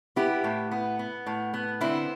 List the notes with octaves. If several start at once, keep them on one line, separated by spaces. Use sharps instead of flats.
B3 E4 G4
A2
B3
B3
A2
B3
D3 C4 E4